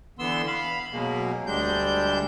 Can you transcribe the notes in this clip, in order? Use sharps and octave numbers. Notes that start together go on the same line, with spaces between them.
D3 E3 B3 C6 E6
F5 B5
F#2 B2 G#3 A#3
D2 G3 G#3 D4 G6